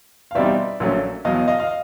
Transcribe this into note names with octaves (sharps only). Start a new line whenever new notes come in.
F5
E2 B2 G3 C4 D#4 D5 E5
A#1 A#2 F#3 A3 C#4
E2 B2 F#3 D#5 F5
D#5 F5
F5